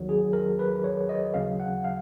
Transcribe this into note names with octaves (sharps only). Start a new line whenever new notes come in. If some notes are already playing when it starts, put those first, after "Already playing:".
Already playing: D#2 D#3 F#3
G#4
A#4
B4
C#5
D#5
D#2 C#3 F#3 F5
F#5
F5